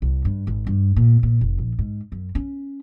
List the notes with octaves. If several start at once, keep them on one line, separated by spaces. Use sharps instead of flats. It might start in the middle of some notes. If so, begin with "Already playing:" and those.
C2
G2
G#1
G2
A#2
A#2
F1
A#1
G#2
F#2
C#4